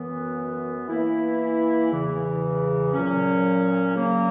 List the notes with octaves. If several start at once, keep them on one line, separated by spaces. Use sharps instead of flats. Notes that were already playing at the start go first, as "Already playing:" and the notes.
Already playing: F#2 E3 B3
E3 A#3 E4
E2 C#3 E3
A#2 F#3 C#4
C#3 F#3 A#3